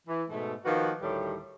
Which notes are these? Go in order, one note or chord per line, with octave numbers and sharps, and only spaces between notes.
E3
G#2 B2 A3
D#3 F3 A#3 F#4 B4
D2 A2 D#3 G3 G4